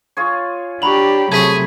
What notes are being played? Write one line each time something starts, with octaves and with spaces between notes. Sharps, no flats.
F4 G#4 C#5
F#3 D4 G4 B5 F#7
C3 F#3 A3 G#4 G#6 B6